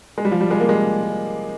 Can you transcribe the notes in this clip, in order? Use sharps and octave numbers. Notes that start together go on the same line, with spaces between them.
G#3
G3
F3
G3
G#3
A#3
G#3